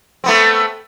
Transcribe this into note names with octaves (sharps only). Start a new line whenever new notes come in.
A3 B3 C4